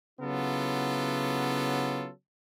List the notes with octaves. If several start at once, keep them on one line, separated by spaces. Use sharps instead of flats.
C#3 F#3 B3 E4 F4 A4